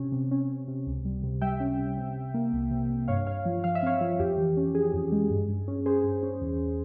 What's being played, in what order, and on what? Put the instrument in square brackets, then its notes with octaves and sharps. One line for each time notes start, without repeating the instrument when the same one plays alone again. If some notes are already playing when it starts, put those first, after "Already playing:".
Already playing: [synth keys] C3 C#4
C3
C#4
C#4
C3
C#2
G3
C3
G3 E5 G5
C#4
C3
C3
C3
A#3
C2
C3
C3
G2 C#5 F5
G2 C#5 F5
F3
F3 F5
E5
C4 C#5 F5
F3
F2 G4
E3
C#4
C#4 G#4
F2
G#3
G2
G2
C#4
C#4 G#4 C5
G2
C#4
E2